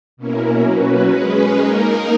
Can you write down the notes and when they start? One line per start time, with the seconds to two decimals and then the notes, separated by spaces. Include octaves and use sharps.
0.17 B2 A#3 C#4 E4 A#4
0.63 F#3 C#4 F#4 B4
1.10 G#3 C#4 G#4 B4
1.55 A#3 D#4 A#4